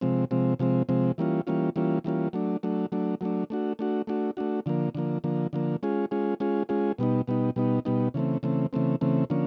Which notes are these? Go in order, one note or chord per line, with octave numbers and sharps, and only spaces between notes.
C3 F3 G#3 C4
C3 F3 G#3 C4
C3 F3 G#3 C4
C3 F3 G#3 C4
E3 G3 A#3 C#4 F4
E3 G3 A#3 C#4 F4
E3 G3 A#3 C#4 F4
E3 G3 A#3 C#4 F4
F#3 A3 D4
F#3 A3 D4
F#3 A3 D4
F#3 A3 D4
A3 D4 F#4
A3 D4 F#4
A3 D4 F#4
A3 D4 F#4
D3 F3 A#3
D3 F3 A#3
D3 F3 A#3
D3 F3 A#3
G#3 C#4 F4 G#4
G#3 C#4 F4 G#4
G#3 C#4 F4 G#4
G#3 C#4 F4 G#4
B2 G3 B3 D#4
B2 G3 B3 D#4
B2 G3 B3 D#4
B2 G3 B3 D#4
C#3 E3 A3 C4
C#3 E3 A3 C4
C#3 E3 A3 C4
C#3 E3 A3 C4
D3 F3 A#3 C#4